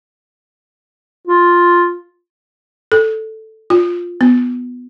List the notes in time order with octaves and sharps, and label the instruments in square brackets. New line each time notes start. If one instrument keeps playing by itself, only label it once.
[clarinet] F4
[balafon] A4
F4
B3